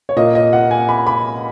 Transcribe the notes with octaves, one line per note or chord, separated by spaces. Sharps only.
C#5
A#2 A#3 D#5
D#5
F#5
G#5
B5
B5